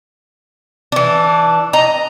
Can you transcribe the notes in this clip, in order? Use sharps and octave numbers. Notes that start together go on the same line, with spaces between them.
E3 D4
D#5 A#5